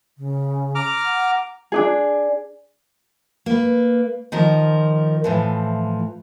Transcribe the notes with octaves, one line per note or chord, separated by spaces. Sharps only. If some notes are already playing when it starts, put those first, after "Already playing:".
C#3
A#5 D6 F6
F#5
D4 D#4 G#4
A#3 B4
D#3 F3 A#4
A2 E3 F3